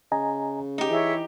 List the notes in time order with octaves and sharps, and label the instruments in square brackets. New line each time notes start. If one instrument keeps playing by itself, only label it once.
[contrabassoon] C#3 [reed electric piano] D#5 G#5 A#5
[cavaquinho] D#4 G4 [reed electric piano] D#5
[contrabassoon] E3 [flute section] E4 C#5 E5 [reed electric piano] G#4